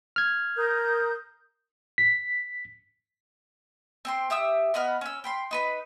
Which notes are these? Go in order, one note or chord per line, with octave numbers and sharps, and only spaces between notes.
F6 G#6
A#4 D#6 G6
B6
C4 G5 C6
G4 E5 D#6 E6
B3 D#5 B5 F6
C#4 E6
G5 B5 C6
D#4 B4 B5